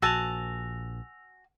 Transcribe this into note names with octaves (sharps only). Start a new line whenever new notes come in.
A#1 F#4 G#5 A5 E6 F7